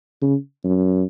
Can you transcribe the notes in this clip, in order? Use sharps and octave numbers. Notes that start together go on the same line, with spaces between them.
C#3
F#2